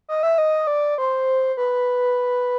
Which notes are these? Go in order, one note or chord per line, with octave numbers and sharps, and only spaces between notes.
D#5
E5
D#5
D5
C5
B4